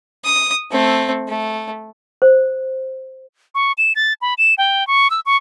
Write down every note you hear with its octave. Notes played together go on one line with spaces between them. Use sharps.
D#6
A3 C4
A3
C5
C#6
E7
A6
B5
E7
G5
C#6
E6
C#6